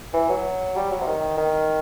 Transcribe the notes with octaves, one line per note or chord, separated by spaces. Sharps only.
E3
F#3
G3
F#3
C3
D#3
D#3